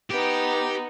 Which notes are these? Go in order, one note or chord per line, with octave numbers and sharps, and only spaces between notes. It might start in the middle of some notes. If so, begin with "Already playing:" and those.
B3 D#4 G4